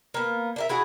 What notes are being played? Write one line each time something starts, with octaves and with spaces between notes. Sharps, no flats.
A#3 B3
D4 A#4 E5
E4 F#4 G#4 F#5